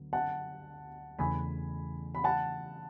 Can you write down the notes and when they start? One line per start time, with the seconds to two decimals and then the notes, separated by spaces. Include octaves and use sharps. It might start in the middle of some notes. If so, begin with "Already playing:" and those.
Already playing: D2 D3 F#3 B3
0.13 F#5 A5
1.18 E2 C#3 E3 A3 G#5 B5
2.15 B5
2.24 F#5 A5